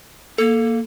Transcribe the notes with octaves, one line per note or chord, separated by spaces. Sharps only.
A#3 A4